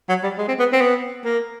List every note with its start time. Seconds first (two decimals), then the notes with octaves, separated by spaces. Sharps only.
0.09 F#3
0.23 G3
0.38 G#3
0.48 C4
0.59 B3
0.72 C4
0.81 B3
1.24 A#3